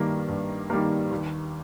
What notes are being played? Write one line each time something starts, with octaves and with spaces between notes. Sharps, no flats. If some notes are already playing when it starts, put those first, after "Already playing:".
Already playing: G2 D#3 G3 A#3
G2
D#3 G3 A#3
D#2